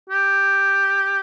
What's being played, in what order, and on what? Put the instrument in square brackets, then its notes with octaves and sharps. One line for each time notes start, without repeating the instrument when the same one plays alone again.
[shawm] G4